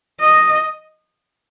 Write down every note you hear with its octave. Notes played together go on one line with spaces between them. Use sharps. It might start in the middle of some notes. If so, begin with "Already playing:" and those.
D#5